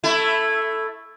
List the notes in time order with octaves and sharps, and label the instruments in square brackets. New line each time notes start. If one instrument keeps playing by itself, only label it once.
[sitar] A3 E4